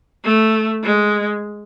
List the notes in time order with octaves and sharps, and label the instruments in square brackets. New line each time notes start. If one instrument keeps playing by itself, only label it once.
[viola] A3
G#3